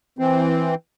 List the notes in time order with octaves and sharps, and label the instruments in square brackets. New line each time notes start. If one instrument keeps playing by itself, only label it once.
[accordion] E3 C4